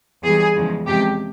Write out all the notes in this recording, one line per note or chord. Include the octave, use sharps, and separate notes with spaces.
E2 E3 G3 G#4
E2 C#3 F3 G#3
E2 C3 F3 G#3 G4